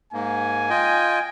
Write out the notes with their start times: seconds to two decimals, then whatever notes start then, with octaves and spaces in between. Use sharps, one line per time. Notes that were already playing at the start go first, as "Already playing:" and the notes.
0.13 G#2 A#3 G#5
0.70 F4 D#5 G5